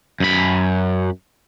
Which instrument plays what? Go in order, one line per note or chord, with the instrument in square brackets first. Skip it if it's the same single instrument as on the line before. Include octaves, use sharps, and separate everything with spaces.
[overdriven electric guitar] F#2 B5